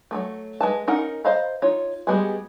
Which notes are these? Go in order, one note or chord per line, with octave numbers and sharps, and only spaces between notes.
F#3 G#3 A3
G#3 B4 A5
C#4 D#4 A#4 F#5
C5 D#5 F5 A#5 B5
D#4 F4 C#5
G3 G#3 B3 F#4 G#4